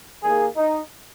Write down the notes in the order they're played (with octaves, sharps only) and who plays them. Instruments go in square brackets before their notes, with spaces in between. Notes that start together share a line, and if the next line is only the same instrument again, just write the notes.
[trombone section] D#2 D#3 A#3 G#4
D#4